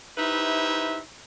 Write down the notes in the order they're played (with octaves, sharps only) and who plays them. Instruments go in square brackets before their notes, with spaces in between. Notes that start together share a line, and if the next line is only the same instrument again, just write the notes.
[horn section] D#4 E4 G4 B4 C5 E5